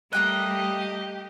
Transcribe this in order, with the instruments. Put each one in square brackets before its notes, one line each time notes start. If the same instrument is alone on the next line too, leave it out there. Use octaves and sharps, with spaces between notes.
[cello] G3 A3 [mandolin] A#3 G5 F#6 [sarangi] G4 [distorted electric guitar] D#5